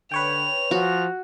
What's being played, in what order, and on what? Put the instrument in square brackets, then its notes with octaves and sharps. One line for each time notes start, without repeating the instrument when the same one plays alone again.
[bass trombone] D3 [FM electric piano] B4 C#5 G5 [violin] F7
[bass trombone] F3 [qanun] F#4